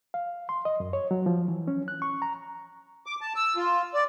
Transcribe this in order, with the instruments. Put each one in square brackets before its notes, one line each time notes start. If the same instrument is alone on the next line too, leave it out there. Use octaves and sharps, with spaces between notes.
[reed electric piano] F5
C6
D#5
F#2
C#5
F#3
F3
E3
C#4
F#6
C#6
A#5
[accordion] D6
A5
E6
F4
D5